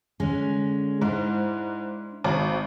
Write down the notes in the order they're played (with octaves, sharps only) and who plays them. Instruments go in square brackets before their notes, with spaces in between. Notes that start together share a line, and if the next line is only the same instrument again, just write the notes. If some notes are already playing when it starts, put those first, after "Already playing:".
[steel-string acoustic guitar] D3 G#3 C#4
[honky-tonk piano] G#2 [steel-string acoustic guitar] D4 E4 C5
[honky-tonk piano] G#1